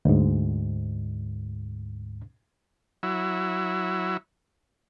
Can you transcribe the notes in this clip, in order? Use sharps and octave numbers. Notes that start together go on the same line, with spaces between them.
D2 G#2
F#3 E4